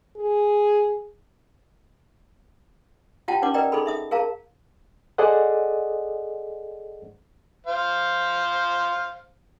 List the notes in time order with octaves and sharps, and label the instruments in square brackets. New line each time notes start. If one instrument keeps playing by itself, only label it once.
[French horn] G#4
[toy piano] E4 F4 G4 F#5 G5 A5
C#4 D#4 B4 C#5 F#5 D6
A#4 B4 D5 D#5 G5 A#5
D#4 G#4 A4 B5
D#4 E5 D#6
G#4 A#4 F5 A5 A#5
[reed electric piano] G#4 A4 C5 D5 D#5 F#5
[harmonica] C5 F5